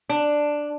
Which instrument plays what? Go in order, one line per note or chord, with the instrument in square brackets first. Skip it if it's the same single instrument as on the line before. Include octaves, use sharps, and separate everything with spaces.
[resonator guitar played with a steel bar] D4